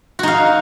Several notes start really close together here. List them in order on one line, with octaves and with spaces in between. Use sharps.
F#4 D#4 F5